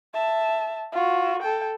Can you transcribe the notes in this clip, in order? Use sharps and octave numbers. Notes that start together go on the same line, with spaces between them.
E5 A5
F4 F#4
A4 G5